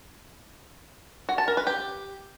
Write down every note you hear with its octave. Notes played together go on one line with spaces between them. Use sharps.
F#4
A5
A#4
B4
G4